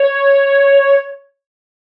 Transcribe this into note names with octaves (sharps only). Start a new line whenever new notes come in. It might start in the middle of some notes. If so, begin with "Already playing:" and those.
Already playing: C#5